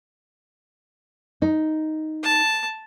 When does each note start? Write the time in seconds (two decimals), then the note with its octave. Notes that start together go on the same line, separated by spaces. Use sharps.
1.42 D#4
2.23 A5